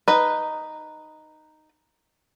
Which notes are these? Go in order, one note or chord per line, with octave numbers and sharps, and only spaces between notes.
D#4 B4